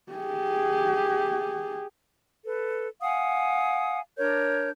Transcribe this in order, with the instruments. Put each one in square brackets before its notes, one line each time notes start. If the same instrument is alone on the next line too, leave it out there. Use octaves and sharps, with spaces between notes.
[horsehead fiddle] G4 G#4
[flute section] A4 B4
F5 F#5 G#5 D#6
D4 A#4 C#5 G6